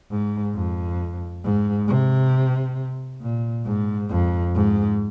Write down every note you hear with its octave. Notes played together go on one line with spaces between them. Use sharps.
G#2
F2
G#2
C3
A#2
G#2
F2
G#2